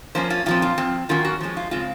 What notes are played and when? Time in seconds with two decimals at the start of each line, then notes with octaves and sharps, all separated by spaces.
0.15 F3 A#3 C#4 C5
0.30 F4
0.46 A#2 F3 C4 F4
0.62 F4
0.78 F3 C4
1.09 D#3 F#3 A#3 C#4 F4
1.25 F#4
1.41 F3 G#3 C#4
1.57 F4
1.71 C#3 G#3 C4 F4